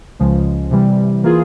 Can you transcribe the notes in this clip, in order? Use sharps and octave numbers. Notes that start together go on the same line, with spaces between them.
C#2 C#3 F3 G#3
C3 E3 G3
E3 A#3 F4 G#4